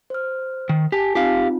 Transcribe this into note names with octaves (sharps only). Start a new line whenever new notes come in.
C5 F6
D#3
G4 G#5 A5
C4 D#4 F4 G4 F5